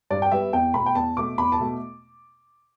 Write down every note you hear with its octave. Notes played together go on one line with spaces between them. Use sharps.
G2 D5
G5
G3 B3 E5
E2 G5
B2 A3 B5
G5
E2 A5
B2 A3 D6
E2 B5
A5
B2 A3